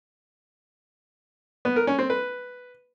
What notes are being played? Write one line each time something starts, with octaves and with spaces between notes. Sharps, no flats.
B3
A#4
C#4
C4
B4